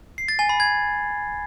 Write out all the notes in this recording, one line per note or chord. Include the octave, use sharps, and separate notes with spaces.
C7
A6
G#5
B5
G#6